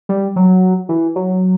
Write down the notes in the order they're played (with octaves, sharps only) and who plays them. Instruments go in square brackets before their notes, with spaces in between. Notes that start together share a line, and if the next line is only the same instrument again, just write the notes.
[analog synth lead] G3
F#3
E3
F#3